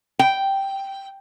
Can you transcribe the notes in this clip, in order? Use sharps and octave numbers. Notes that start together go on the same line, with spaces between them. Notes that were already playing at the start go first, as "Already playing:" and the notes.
G5